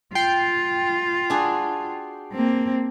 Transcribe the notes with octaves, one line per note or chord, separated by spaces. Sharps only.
F4 G5 C7
D4 F#4 G#4
A#3 C4